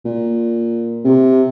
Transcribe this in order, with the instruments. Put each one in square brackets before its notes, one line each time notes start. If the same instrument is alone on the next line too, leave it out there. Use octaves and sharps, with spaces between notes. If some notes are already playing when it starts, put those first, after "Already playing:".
[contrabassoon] A#2
C3